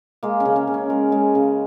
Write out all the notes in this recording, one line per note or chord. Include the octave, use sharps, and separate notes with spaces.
G#3 A#3
C#4
C#3
C#4
C#3
C#4
G#3 A#4
G#3
C#3